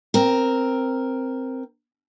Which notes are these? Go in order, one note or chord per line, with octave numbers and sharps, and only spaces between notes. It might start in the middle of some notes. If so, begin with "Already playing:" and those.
C4 A#4